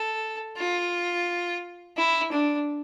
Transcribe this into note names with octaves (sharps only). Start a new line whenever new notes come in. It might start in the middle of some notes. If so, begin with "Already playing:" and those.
Already playing: A4
F4
E4
D4